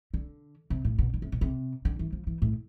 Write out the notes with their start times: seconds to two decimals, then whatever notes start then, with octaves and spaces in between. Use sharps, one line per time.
0.14 D3
0.70 C3
0.85 A2
0.98 B2
1.14 D3
1.22 C3
1.32 B2
1.41 C3
1.85 D3
1.99 E3
2.12 F3
2.27 E3
2.42 A2